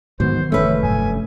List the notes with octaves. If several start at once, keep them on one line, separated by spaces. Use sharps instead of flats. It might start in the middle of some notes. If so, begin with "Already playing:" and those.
G#2 B2 D#3 E3 F#3 C5
F1 A3 C#4 B4 E5
F#2 A2 G#5
G2